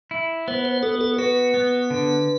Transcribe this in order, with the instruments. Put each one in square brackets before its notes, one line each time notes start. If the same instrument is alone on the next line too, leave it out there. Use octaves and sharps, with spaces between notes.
[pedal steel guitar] E4
[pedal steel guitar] B3 [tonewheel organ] C5
[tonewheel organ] C5
[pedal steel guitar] B3 [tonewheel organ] A4
[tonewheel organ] A4
[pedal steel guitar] F#4 [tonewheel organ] B4
[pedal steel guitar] B3
D3